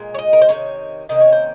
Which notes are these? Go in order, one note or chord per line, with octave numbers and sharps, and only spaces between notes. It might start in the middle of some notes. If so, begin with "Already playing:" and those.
Already playing: A#2 G#3
C#5
D#5
A#4
C5
C3 D#3 A#3 C#4 C#5
C3 D#3 A#3 C#4 D#5
C#5
C5